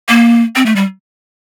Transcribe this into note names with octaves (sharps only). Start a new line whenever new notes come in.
A#3
C4
A3
G3